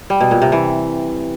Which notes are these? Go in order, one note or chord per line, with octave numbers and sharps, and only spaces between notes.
G3
B2
A#2
C3
E3